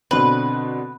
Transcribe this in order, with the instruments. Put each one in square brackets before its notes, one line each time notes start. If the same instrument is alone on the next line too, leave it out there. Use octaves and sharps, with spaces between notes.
[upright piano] B2 D3 C4 [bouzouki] B4